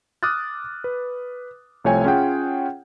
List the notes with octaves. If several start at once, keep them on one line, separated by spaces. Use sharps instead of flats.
D6 D#6 F6 F#6 A6
B4
C2 F3 A3 C#5 G5 G#5
C#4 F4 G#4 C#5 F#5 G5